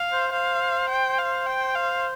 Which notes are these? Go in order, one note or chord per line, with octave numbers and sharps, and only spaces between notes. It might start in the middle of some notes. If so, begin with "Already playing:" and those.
Already playing: F5
C5
C5 F5
G5
F5
G5
F5